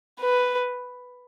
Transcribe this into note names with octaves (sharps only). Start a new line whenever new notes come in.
B4